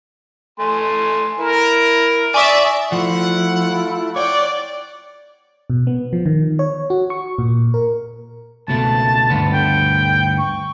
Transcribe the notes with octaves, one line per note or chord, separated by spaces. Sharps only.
A3 G#5 C6
E4 A#4
D5 E5 G#5 C#6 D#6
F3 A3 E4 F4 F#5
C4 C#5 D5 F#5 G5
B2
B3
F3
D#3
C#5
F#4
C#6
A#2
A#4
C#2 B2 A3 A5
D2 G2 B3
G5
C#6